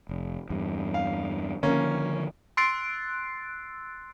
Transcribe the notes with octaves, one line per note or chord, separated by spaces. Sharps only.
F1
E2 G2
F5
D3 D#3 F3 A#3 C#4
C6 E6 F#6 A6 C7 D7